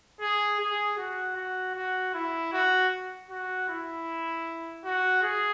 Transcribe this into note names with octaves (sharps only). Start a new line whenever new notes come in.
G#4
G#4
F#4
F#4
F#4
E4
F#4
F#4
E4
F#4
G#4